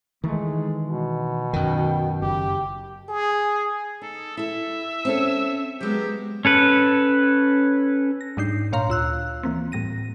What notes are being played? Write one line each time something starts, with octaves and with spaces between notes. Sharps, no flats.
D#3 E3 G#3 A3
B2
F#2 D#3 G5
F#1 G4
G#4
D#4 A4
E4 A4 E5
C4 C#4 A4
F#3 G#3 B3 G4
C#4 A4 B4
A#6
G#2 G3 D4 D#4 G6 C7
A#2 C#5 F5 A#5 C6
D2 F4 E6 F#6
E3 A#3 C4
A2 G3 A#6 D#7